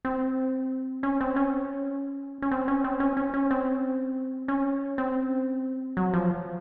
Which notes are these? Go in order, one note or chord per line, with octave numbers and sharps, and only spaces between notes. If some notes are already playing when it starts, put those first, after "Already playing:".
C4
C#4
C4
C#4
C#4
C4
C#4
C4
C#4
C#4
C#4
C4
C#4
C4
F#3
F3